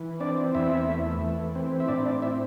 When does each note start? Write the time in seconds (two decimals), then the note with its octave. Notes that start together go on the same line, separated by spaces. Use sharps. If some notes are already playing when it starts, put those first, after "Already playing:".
Already playing: E3
0.20 C4 D4 D5
0.55 E2 E4 E5
0.88 A3
1.22 E3
1.55 C4
1.80 E5
1.88 A2 D4 D5
2.06 D4 D5
2.22 C4 E4 E5